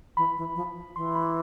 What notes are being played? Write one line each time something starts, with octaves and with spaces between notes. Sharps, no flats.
E3 B5
E3
F3
E3 C6
B5